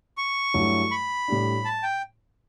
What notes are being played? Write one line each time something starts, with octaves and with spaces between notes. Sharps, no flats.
C#6
G2 F#3 A3 E4
B5
A2 G3 D4
A5
G5